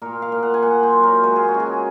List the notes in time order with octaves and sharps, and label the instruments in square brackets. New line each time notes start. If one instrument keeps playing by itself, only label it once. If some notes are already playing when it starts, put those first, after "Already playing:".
[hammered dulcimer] A#2 A#4
F5
A#2
F#5
G#5
A#2 F#5
C5
F#3
A#4
G#3 A#4
G#4
F#4
C#3
G#4